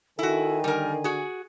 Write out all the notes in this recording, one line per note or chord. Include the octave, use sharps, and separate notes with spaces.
D#3 E4 F#4 A4 G#5
D3 G3 A#4
F#4 G#4